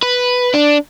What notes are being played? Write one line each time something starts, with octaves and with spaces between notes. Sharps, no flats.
B4
D4